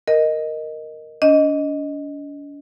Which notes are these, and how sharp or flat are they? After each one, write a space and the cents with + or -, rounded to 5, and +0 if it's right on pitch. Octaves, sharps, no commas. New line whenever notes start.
A#4 +0 D#5 +0
D4 -45 D#5 +0